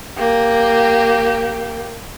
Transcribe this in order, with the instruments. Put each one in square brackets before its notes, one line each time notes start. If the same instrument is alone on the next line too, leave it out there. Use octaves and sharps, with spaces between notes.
[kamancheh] A#3 G4